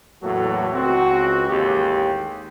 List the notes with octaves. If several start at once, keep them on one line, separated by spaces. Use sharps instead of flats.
E2 A2 F#3 A#3 F#4 A4
C#2 C4 F#4
A1 D#2 G#3 G4